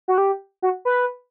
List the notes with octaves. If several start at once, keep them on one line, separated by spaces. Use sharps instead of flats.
F#4
G4
F#4
B4